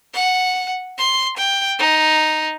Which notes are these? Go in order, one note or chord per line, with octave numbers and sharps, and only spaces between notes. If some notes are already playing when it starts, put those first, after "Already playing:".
F#5
C6
G5
D#4